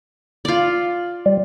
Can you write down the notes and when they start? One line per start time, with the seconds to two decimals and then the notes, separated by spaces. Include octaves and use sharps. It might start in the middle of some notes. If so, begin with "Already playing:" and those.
0.45 F4 D5
1.26 G3